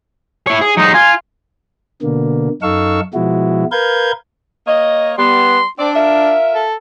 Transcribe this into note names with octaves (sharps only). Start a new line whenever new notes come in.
E4 C#5
G#4
F#3 G#3 D#4
F4 G#5
B2 D3 A#3
F#2 D#4 A4 F5 C#6 E6
B2 F3 G#3 E4 F#4
A#4 B4 F5 G6 G#6
A#3 C#5 D#5
G3 B3 C6
C4 D4 D5
F4 A#4 E5
A4